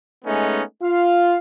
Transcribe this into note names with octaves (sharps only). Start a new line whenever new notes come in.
G#3 A3 B3 C#4 D#4
F4 F5